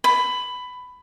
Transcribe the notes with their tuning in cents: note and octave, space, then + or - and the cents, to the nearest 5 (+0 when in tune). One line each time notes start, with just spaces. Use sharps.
B5 +15